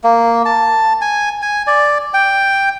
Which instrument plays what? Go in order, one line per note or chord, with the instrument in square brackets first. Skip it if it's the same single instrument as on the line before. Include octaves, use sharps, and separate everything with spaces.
[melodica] A#3
A5
G#5
G#5
D5
G5